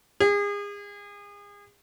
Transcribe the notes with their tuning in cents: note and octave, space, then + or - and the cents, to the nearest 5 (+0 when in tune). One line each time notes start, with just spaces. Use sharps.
G#4 -35